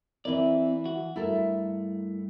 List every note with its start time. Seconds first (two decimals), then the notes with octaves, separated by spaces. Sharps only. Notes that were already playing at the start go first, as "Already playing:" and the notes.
0.25 E3 C4 E4 A#4 D5
0.86 F#4
1.16 G2 A3 E4 A4 A#4